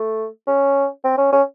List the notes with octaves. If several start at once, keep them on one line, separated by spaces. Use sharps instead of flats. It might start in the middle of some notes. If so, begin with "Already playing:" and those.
Already playing: A3
C#4
C4
C#4
C#4